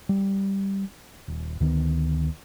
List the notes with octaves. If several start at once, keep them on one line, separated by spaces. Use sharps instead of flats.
G3
D#1
D2 D#3 G#3 B3